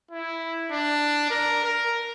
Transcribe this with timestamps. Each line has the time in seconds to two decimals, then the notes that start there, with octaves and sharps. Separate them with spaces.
0.11 E4
0.72 D4
1.30 A#4
1.64 A#4